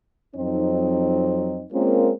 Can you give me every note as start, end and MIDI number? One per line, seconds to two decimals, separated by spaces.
0.36 1.65 41
0.36 1.65 54
0.36 1.65 60
0.36 1.65 63
1.73 2.11 56
1.73 2.11 58
1.73 2.11 60
1.73 2.11 61
1.73 2.11 65
1.73 2.11 70